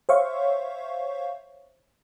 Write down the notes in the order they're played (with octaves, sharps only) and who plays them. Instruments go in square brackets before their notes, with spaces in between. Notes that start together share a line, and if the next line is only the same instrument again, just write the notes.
[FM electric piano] C5 C#5 E5 F5 C#6